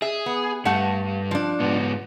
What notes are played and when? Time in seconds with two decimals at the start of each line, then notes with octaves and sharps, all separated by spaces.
0.02 G#4 E5
0.26 B3
0.65 G2 A3 F#5 A5
1.31 F3 D4
1.60 G#2 B3